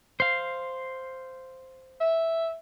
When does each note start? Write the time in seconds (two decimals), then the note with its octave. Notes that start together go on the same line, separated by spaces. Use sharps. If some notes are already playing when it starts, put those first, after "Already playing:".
0.20 C5 F5
2.01 E5